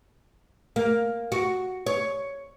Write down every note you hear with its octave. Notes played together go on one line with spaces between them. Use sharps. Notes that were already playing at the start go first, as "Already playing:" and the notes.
A#3
F#4
C#5